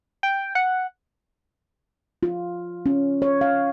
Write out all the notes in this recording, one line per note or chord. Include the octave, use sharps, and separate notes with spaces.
G5
F#5
F4
C#4
C#5
F5